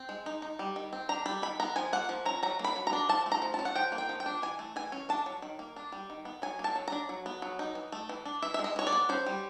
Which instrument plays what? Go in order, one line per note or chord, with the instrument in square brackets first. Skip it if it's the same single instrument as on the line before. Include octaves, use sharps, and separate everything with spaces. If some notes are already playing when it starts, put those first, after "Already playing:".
Already playing: [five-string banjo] C4
G#3
D#4
D#4
G3
D#3
C4
D4 A#5
G3 B5
D#3 B5
B3 A#5
F3 G#5
A#3 F#5
F3
C#4 A#5
F#3 A#5
A#3
B5
F#3
A#5
D4
F3 A5
A3
A#5
F3
A5
C#4
F#5
F3 G5
A#3
G5
F3
G5
D4
E3 G#5
A3
E3 G#5
C#4
D4 A5
F#3
D#3
A#3
D4
G3
D#3
B3
F#3 G#5
A#3
A5
F#3
D4 A#5
F#3
B3
F#3
D#4
E3
A3
E3
D4
E3 E5
E5
G#3
D#5
E3 C#5
D5
B3
C#4 C5
G3